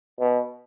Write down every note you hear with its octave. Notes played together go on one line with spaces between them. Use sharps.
B2